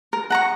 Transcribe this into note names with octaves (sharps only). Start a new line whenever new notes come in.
A#4
F#5 A#5 C#6